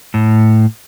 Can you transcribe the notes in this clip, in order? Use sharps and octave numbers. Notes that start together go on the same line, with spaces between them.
A2